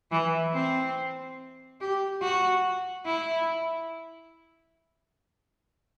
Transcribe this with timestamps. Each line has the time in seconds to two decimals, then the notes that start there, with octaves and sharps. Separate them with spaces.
0.11 E3
0.54 C4
1.81 G4
2.22 F#4
3.06 E4